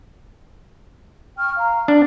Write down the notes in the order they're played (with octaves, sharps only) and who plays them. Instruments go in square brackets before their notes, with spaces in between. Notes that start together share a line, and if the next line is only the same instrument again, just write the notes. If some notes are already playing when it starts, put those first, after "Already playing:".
[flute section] G5 C#6 F6
F5 A#5
[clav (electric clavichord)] D4 [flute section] D5